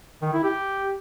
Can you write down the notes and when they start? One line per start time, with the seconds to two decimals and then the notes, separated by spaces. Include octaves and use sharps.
0.22 D#3
0.33 E4
0.43 G4